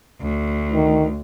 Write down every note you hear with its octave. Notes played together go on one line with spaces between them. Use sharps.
D2
D#3